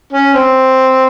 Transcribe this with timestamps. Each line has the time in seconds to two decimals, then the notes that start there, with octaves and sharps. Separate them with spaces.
0.13 C#4
0.34 C4